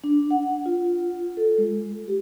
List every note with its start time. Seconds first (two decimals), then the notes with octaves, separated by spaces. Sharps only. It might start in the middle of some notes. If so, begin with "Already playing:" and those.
0.04 D4
0.31 F#5
0.66 F4
1.37 A4
1.58 G#3
2.08 G4